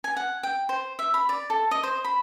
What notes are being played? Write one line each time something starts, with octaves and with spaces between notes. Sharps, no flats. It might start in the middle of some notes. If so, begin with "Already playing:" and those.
G#5
F#5
G5
C5
E5
B5
D5
A4
D#5
C5
B5